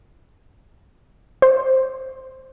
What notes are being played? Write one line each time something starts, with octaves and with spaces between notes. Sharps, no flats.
C5